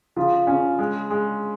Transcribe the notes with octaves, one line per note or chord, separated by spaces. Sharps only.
C#3 F3 F4
C#3 C#4
G#3
G#3